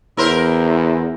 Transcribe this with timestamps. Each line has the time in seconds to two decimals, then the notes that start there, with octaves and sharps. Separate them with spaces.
0.17 E2 E4 A#4 C5